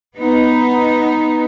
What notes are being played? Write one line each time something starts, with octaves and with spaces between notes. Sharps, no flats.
B3 D#4